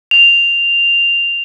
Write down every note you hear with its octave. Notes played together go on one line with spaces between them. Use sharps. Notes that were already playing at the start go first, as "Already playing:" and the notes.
F7